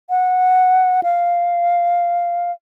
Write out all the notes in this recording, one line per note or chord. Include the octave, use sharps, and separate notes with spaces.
F#5
F5